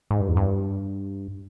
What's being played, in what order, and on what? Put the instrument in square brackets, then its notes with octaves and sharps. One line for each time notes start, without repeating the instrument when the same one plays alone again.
[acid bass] G#2
G2
E2
G2